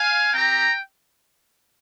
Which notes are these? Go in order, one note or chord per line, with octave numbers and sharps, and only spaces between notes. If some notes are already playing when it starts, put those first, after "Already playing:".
Already playing: F5 G#5
C4 G4 G5 A#5